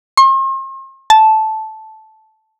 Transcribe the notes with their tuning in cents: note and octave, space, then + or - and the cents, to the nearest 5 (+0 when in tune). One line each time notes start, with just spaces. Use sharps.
C6 +45
A5 -10